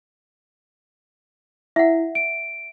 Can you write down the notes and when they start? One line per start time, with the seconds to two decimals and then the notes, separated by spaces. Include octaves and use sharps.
1.76 E4 E5 F#5
2.15 D7